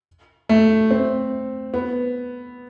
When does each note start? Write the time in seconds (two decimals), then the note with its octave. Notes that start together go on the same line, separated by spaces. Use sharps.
0.49 A3
0.91 C4
1.74 B3